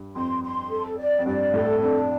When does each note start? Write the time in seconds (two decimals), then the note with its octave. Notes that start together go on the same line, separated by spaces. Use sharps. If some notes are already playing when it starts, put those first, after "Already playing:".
Already playing: G2
0.15 F2 C6
0.43 C6
0.71 A4
0.98 D5
1.19 F2
1.26 G2 D5
1.54 A2 A4
1.82 F2 D4